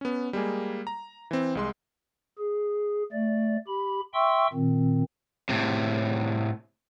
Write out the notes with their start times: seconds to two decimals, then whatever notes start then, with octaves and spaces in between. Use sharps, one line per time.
0.01 B3 C#4
0.33 G3 G#3 A#3 G#4
0.87 A#5
1.31 E3 C4
1.55 C2 G#3 C6
2.38 G#4
3.12 A3 D5
3.67 G4 B5
4.14 E5 G5 C6 C#6 E6
4.53 A#2 D#3 C4
5.49 A2 C3